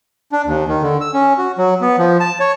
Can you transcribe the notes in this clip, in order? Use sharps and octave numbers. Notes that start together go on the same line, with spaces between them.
D4
D#2
D#3
D3
E6
C#4
F#4
F#3
B3
F3
A5
C#5